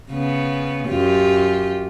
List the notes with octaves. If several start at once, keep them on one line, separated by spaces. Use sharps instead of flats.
C#3 B3
F#2 F4 G4